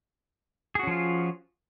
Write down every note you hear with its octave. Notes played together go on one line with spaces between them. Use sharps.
F3 C#4 F4 F#4 G#4